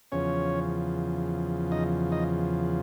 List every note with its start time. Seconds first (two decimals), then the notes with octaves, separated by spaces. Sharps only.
0.12 E2 C#3 F3 C#4 C#5
1.72 D#4 D#5
2.12 D#4 D#5